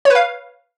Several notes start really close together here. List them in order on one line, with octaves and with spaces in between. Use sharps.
C#5 B4 F5